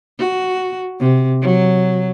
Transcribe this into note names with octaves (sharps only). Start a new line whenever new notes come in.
F#4
C3
F#3